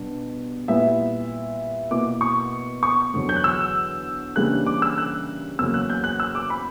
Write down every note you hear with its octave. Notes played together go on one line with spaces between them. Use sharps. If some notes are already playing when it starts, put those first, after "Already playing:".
Already playing: B2 G3 D4
A#2 G3 B3 E4 E5
B2 A#3 E4 D6
C#6
C#6
E2 D3 F#3
G6
F#6
E6
C#3 E3 G3 A#3 D4 F#6
D6
E6
F#6
E2 C#3 F#3 A#3 E6
F#6
G6
F#6
E6
D6
B5